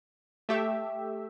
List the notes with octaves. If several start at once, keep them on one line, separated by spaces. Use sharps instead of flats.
A3 G4 E5